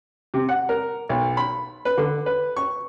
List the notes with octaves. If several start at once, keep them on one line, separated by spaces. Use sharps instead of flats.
C3
F#5
A#4
B1
B5
B4
D3
B4
C#6